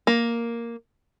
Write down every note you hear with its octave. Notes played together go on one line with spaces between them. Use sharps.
A#3